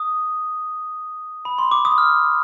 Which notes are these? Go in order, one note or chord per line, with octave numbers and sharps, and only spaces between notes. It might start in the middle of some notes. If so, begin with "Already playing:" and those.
Already playing: D#6
B5
C6
D6
D#6
F6